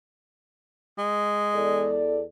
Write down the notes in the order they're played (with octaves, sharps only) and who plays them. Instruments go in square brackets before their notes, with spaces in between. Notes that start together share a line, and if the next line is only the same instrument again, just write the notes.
[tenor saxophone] G#3
[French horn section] E2 A4 D5